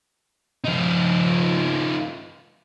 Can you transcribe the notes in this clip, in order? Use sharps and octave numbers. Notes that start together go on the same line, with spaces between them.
F3 D#4